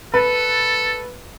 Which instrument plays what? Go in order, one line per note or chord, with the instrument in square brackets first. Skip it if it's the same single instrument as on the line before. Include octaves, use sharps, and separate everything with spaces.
[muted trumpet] A4 [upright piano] B4